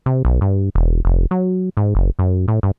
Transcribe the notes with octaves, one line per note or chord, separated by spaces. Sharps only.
C3
B1
G2
E1
F1
F#3
G#2
F#1
F#2
A2
G2